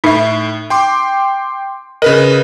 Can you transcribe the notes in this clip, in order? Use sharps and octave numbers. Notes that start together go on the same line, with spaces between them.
A2 D#4 E5
G5 C6 D6
C#3 A#4 B4 D#5